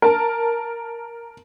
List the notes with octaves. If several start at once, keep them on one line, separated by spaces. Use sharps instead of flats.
A#4 A5